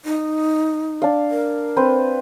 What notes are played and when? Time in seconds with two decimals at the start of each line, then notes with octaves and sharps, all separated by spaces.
0.05 D#4
1.02 D4 F5
1.31 A#4
1.76 C4 B4 C5